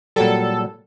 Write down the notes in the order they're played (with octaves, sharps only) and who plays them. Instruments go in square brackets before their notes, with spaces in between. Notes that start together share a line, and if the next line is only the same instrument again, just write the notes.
[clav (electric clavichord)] A#2 F#3 G3 [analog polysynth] A4